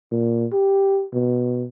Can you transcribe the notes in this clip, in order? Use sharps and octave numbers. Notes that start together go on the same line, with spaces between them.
A#2
G4
B2